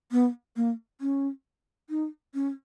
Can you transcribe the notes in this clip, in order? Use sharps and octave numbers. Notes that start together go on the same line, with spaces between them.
B3
A#3
C#4
D#4
C#4